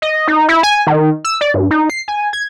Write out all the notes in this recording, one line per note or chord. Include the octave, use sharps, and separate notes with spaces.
D#5
D#4
E4
G#5
D#3
E6
D5
G2
D#4
C7
G#5
G#6